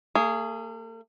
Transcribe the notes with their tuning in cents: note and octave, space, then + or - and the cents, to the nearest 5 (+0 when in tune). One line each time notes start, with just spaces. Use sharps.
A#3 -45 G#4 +0